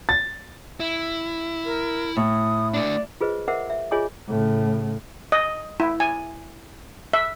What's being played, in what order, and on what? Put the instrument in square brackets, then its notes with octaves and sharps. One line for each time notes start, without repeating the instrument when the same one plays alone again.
[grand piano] A6
[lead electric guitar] E4
[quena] A#4
[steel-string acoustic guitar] A2 [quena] D#6
[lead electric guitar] A3 D4 [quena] D5
[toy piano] F4 G#4 B4 C5 D#5
A#4 C5 D#5 E5 F#5 D6
E5
F4 G#4 C#5 D#5 G#5 D6
[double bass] A2 C#3
[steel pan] D#5
E4
G#5
E5